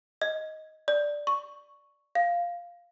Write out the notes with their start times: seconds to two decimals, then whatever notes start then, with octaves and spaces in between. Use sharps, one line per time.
0.22 D#5
0.88 D5
1.27 C#6
2.15 F5